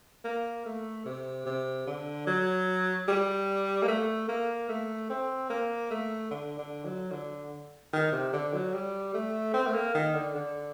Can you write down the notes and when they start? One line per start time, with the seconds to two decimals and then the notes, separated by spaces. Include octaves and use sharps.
0.24 A#3
0.66 A3
1.05 C3
1.46 C3
1.87 D3
2.27 F#3
3.08 G3
3.82 A#3
3.88 A3
4.28 A#3
4.69 A3
5.09 C4
5.50 A#3
5.91 A3
6.31 D3
6.58 D3
6.85 F#3
7.11 D3
7.93 D#3
8.12 C3
8.33 D3
8.53 F#3
8.73 G3
9.14 A3
9.53 C4
9.66 A3
9.74 A#3
9.95 D#3
10.14 D3
10.34 D3